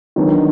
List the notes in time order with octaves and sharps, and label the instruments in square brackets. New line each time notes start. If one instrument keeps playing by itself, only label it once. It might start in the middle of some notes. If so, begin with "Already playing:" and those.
[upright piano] D#3 F#3 B3 D4